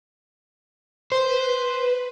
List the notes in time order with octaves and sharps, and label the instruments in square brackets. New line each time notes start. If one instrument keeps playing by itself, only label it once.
[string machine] B4 [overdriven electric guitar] C5